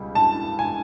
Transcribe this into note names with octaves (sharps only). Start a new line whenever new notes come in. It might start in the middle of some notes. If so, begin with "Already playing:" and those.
Already playing: C#2 B2 G3
A5
G#5